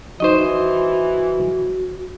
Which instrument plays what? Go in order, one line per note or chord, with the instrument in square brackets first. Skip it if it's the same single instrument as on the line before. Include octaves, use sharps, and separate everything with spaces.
[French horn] E3 [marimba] F3 D#4 [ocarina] F#4 [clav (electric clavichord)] C5 D#5